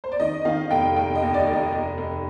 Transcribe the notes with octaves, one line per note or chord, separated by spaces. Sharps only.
C5
D5
D#3 D#5
D#3 F5
F1 G5
F1 G5
D#5
D#2
D5
F1
D#5
F1
F1